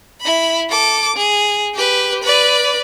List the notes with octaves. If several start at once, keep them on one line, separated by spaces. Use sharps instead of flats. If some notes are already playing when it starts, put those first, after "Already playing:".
E4 B5
A4 D6
G#4
G4 B4
B4 D5